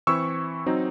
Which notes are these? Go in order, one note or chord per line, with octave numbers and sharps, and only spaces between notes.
E3 C4 E4 C#6 E6
F#3 C4 D#4